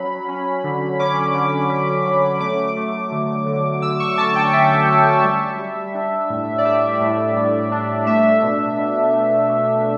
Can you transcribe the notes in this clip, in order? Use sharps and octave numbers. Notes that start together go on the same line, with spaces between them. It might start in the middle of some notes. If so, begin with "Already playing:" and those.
Already playing: F#3 C#4 B5
C#4
D3
C#4 D6
D3
C#4
F#3
A3 D6
A3
D3
D3
D3 E6
C#6
C#4 A5
G5
C#4 E5
C#4
G3
G3
D4
A2
D5
G3 E5
A2
A2
D4
A3 E5
B2
B2
A3
A3